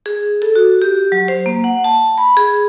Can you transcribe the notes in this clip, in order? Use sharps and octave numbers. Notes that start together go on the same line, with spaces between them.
G#4
A4
F#4
G4
F#3
C5
A#3
F#5
A5
B5
G#4